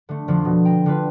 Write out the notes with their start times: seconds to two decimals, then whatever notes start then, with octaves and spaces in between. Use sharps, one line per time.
0.09 D3 A3
0.28 F2 D3 F3
0.45 B2
0.65 G5 A#5
0.86 D3 F4 B4